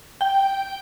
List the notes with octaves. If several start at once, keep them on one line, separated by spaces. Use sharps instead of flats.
G5